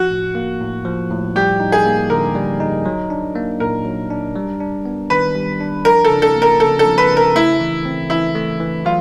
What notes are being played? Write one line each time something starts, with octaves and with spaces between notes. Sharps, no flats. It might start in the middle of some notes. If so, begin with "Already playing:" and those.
Already playing: F3 F#4
A2
A#3
A2
F3
A2
G3 G4
D#4
G#4
A#3
D3 A#4
G3
D#4
F#3
D4
A#3
A#2 A#4
F#3
D4
G3
D4
B3
D#3 B4
G3
D4
F3 A#4
A4
C#3
A4
A#3
A#4
C#3 A4
A4
F3
B4
C#3
A#4
A3 E4
E3
C4
E3 E4
A3
E3
F#3 F4